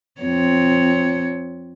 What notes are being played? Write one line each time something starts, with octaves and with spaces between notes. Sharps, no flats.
F2 C4 C#5